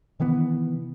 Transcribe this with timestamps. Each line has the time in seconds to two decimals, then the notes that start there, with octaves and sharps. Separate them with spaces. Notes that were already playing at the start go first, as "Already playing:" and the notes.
0.20 C3 D#3 E3 B3